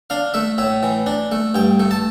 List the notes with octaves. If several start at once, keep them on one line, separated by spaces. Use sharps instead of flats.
D4 F5
A3 E5
A2 E5
E3
D4
A3
G2 G5
A3
A5